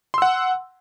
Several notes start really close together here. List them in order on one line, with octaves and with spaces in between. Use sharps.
C6 E6 F#5